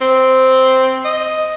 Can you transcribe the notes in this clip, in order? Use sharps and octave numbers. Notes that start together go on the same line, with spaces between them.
C4
D#5